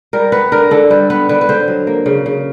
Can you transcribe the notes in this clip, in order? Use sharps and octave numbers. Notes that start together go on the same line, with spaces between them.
G3 A#4
B3 B4
D3 A#4
D3 A4
G3 B4
B3 B4
D3 B4
B4
D3 C5
F#3
A#3
C#3
C#3